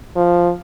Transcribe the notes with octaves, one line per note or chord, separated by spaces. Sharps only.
F3